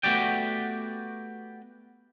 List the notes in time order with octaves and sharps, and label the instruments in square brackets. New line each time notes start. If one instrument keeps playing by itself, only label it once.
[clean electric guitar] A3 B3 F#4 G4 D5 G5